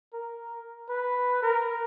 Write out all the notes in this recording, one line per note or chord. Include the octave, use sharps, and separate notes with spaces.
A#4
B4
A#4